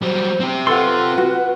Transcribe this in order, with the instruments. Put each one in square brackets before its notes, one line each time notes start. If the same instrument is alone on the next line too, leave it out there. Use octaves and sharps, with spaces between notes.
[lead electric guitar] F#3 G3 [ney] C5
[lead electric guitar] C4 G4
[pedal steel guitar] F4 C6 [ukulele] A4 F#5 [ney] B4
[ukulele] F#4